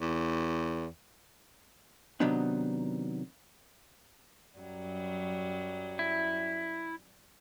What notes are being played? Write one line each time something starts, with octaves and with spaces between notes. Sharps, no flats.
E2
C3 D#3 F#3 B3 D4 D#4
F#2 F#3 G3
E4